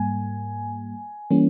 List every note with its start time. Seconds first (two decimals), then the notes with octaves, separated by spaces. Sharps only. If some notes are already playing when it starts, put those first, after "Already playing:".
Already playing: G#2 G3 A#3 G#5
1.31 E3 G3 A#3 C#4